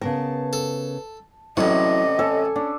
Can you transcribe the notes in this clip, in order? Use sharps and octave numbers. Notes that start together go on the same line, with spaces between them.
C#3 B3 A#4 A5
A4
A1 C3 F#3 E4 A4 D5 D#5 C#6
A4 C#5 G#5 A5
C#4 D4